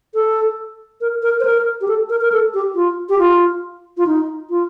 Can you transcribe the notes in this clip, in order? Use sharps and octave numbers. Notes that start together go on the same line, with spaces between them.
A4
A#4
A#4
C5
A#4
G4
A4
A#4
A#4
A4
G4
F4
G4
F4
F4
D#4
F4